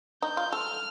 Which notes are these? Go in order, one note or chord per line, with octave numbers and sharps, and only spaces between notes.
D#4 G6
F4
A4 F6